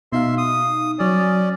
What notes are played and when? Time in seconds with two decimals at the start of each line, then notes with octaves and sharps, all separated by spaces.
0.12 B2 D#4 E5 F5 C6
0.38 D#6
0.99 F#3 C#4 D5 D#6